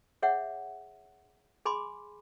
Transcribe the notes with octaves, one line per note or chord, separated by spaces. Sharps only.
G#4 C#5 E5 F#5
G#4 G#5 B5 C6 D6